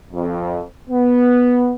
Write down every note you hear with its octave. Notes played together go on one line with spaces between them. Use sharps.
F2
B3